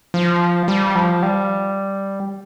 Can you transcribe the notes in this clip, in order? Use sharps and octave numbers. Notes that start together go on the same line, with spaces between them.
F3
G3
F3
G3